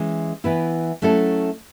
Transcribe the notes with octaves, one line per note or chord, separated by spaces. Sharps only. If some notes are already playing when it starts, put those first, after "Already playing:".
Already playing: E3 G#3 C#4
E3 B3 E4 B4
F#3 A3 C#4 E4 A4